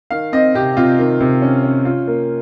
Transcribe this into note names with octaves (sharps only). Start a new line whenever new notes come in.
D#3 F5
C4 D#5
C3 G4
C3 F4
D#3
C3
C#4
C#4
F4
A#3